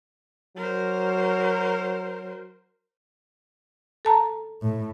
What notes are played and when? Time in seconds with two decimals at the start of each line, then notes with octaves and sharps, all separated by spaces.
0.56 F#3 A#4 C5
4.05 A4 A5 A#5
4.62 A2